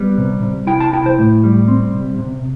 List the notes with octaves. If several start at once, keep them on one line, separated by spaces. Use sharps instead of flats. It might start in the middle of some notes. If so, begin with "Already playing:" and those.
Already playing: G3 B3
C3
C3
E4 G5
A5
E4 G5
C5
A2
G3
C4
C3
C3